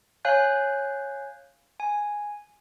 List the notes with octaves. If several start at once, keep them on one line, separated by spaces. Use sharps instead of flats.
C#5 F5 G#5 F#6 G6
G#5